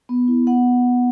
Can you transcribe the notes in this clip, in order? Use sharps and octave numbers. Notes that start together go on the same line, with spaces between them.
B3
E4
B3 F#5